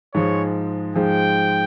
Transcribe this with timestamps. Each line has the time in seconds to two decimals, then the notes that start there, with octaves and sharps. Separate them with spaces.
0.14 G#2 F3 G#3 C#5
0.96 G#2 F3 G#3 G5